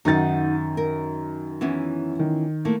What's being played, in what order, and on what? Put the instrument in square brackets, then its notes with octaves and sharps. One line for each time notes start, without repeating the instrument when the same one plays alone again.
[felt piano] F#2 D#3 A6 [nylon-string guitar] D#4 F#5
[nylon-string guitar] A#4
E3 B3 C#4
[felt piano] D#3
[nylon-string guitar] A3 A#3 E4